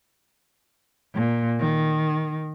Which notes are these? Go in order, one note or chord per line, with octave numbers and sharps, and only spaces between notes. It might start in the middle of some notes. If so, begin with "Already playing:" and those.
A#2
D#3